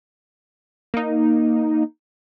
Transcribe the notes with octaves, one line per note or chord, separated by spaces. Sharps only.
A#3 D#4